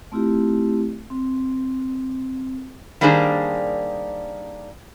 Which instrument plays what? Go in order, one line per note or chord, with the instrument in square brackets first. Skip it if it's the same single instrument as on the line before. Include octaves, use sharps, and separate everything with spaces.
[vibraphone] A3 C4 E4 F4 G4
C4
[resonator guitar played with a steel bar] D#3 G3 A#3 D4 G#4 C5